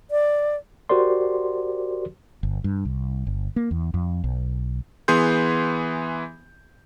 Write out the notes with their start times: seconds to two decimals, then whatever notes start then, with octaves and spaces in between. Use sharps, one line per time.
0.11 D5
0.89 F#4 G4 A#4 C5 D5 C6
2.43 G1
2.64 G2
2.85 C2
3.27 G1
3.56 A#3
3.71 E2
3.94 F2
4.24 B1
5.08 E3 B3 G#4 C6 G6